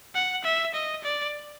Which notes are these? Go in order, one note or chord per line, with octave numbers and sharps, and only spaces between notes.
F#5
E5
D#5
D5